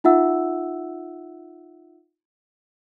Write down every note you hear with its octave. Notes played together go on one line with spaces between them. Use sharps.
D#4 F4 E5 F#5 E6